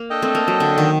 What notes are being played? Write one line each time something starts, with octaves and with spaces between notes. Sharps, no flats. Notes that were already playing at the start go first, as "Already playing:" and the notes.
Already playing: A#3
D4 A4 D#5 G5
A3 C4
A#3
F#3
D3
D#3